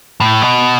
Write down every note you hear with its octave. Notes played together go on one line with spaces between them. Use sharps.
A2
B2